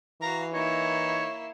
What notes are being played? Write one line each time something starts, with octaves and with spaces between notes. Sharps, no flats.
E3 F#4 F5 A#5
A#3 D#4 E4 C#5